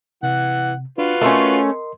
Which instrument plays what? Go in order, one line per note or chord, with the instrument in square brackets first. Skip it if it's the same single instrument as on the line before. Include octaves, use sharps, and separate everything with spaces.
[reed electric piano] C3 [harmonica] E3 F#5
[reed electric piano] D4 [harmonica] F4 F#4 B4
[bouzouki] A3 C#4 [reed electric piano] A#4 D#5 C6